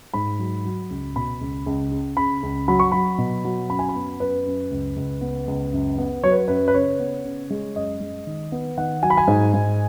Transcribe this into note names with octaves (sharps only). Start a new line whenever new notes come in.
G#2 B5
F#3
F#3
C#2
B2 B5
C#2
C#2
C#3
C#3 B5
C#2
F#3 B5
C#6
F#3 B5
B2
F#3
F#2 B5
G#5
B5
B3
F#2 B4
F#2
C#2
C#2
B3
C#2
F#2
B3
F#3 C#5
B4
F#2 B4
B4
C#3 C#5
B3
C#3
G#3
F#2 D#5
G#3
D#3
B3
D#3 F#5
F#3 G#5
B5
G#5
G#2
G#2